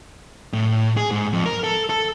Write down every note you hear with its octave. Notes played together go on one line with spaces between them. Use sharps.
A2
G#4
G#2
F2
A#4
A4
A4